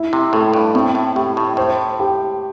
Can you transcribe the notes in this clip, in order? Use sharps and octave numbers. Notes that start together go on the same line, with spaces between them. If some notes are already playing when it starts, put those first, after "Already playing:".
Already playing: E4
C3
A2 A3
G2
A2 C4
A2
A2 G4
A2
A2 C5
G4